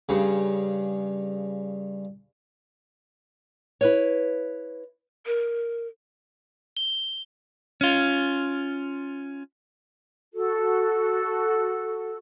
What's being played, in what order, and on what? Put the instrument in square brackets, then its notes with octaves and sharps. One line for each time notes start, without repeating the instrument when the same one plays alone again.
[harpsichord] G2 C#3
[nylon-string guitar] E4 B4 C#5
[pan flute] A#4
[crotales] G7
[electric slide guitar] C#4 F4
[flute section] F#4 A4